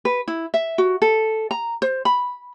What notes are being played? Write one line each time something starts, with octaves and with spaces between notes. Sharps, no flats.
B4
E4
E5
F#4
A4
A#5
C5
B5